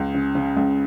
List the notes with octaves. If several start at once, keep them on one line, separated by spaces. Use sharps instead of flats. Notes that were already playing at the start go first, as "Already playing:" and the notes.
Already playing: C#2
C#3
C#3
C#2